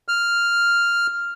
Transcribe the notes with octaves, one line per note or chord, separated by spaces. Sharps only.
F6